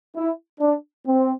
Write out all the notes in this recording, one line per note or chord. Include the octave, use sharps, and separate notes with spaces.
E4
D4
C4